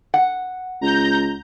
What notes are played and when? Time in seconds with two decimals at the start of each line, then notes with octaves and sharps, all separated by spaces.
0.14 F#5
0.81 C#2 A#5 G6